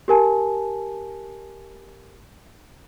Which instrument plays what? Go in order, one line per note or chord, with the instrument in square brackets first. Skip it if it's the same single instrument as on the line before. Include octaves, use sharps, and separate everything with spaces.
[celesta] G4 A#4 G#5 A5